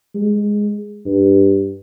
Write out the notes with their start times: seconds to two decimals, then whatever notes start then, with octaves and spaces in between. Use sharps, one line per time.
0.15 G#3
1.06 G2